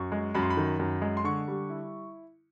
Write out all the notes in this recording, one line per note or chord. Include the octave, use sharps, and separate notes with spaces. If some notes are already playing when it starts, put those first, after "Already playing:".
Already playing: F#2 C#6
G#3
F#2 B5
C6
B5
D#3
F#2
G#3
C6
D3 C#6
G3
E4